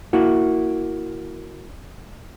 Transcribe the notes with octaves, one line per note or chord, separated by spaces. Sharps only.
A#3 E4 F#4